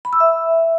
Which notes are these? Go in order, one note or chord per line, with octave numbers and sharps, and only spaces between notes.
B5
E6
E5